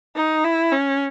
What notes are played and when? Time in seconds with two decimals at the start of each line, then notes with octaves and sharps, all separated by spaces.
0.16 D#4
0.44 E4
0.73 C#4